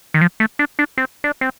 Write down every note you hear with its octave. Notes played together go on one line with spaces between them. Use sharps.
D#3
F3
A3
D4
D4
C4
D4
C4